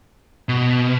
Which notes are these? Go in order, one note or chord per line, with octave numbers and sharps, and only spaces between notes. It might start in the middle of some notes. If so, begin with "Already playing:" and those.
B2